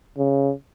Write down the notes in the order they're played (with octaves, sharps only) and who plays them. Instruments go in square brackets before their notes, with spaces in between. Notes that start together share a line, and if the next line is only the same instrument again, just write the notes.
[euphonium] C#3